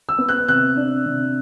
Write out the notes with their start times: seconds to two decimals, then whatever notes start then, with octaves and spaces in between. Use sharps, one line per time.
0.09 E6
0.18 B3
0.29 F#6
0.48 C3 F#6
0.77 D4
1.05 C3